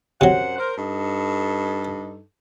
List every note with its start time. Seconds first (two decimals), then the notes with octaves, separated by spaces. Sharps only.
0.21 F#2 C3 F#3 C5 F#5
0.59 A#4 C5
0.78 G2 D#4 A4